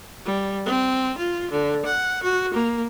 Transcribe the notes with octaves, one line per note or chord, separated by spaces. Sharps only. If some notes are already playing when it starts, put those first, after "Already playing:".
G3
C4
F4
D3
F#5
F#4
A#3